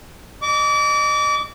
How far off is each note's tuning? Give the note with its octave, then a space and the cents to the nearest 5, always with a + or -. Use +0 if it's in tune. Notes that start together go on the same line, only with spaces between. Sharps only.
D#5 -35 D6 -35